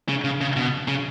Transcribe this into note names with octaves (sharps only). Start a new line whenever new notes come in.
C#3
C#3
C#3
B2
C#3